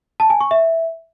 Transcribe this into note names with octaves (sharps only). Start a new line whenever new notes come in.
A5
G#5
C#6
E5